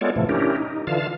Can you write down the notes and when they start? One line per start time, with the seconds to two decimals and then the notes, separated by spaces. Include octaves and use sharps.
0.01 G#3 B3 F4 A4 C#5 D5
0.16 A2 C3 E3 F3 A3
0.29 C#4 D4 E4 G4 A#4
0.56 D#4
0.87 D3 E3 F4 F5 A5